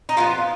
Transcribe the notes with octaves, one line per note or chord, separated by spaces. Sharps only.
D#4
F3 G#3 B3 F4